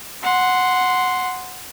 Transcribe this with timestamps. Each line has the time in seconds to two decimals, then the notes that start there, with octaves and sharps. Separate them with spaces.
0.23 F#5 C6